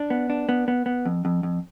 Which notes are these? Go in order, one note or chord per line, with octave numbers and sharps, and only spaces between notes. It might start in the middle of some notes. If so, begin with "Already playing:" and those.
Already playing: D4
B3
D4
B3
B3
B3
F2
F2
F2